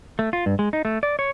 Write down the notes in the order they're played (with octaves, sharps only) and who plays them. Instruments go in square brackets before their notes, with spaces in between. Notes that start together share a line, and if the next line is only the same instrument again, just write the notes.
[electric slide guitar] A3
F4
G2
G#3
D#4
A3
D5
C#5